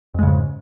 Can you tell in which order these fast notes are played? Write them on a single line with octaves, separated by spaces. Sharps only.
F2 G#3 C#3 G#2